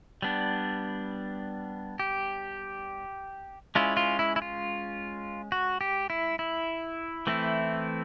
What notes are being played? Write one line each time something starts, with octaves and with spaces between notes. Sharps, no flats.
G3 B3 D4
G4
G#3 C#4 E4 F4
F4
E4
E4
F4
F#4
G4
E4
E4
E3 A3 C4 E4